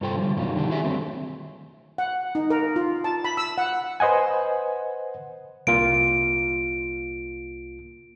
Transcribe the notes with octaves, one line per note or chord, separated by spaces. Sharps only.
G2 C3 F4 A4 C5 G5
D3 F3 G3
F#2 B2 D#3 G3 F4
D3 D#3 D4 G4
E4 F#4 G#4 E5
D3 D#3 F#3 G3 A3 C4
F#5
D#4
A#4
F4
A5
B5
E6
F#5
B4 C5 D#5 F#5 G#5
C2 A#3 F4 D7